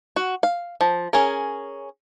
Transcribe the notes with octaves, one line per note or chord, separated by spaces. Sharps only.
F#4
F5
F3
C#4 G#4 A#4